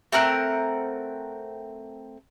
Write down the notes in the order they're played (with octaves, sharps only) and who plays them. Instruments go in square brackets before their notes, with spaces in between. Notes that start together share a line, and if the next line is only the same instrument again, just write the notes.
[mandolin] A3 C4 A#4 F#5